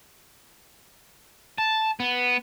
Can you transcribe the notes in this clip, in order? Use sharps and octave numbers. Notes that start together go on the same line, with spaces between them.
A5
B3